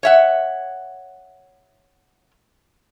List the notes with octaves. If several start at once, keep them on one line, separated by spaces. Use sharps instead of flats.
C#5 E5 F#5